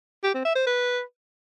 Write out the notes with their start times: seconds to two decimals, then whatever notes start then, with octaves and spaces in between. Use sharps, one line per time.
0.23 G4
0.34 C4
0.45 E5
0.56 C5
0.66 B4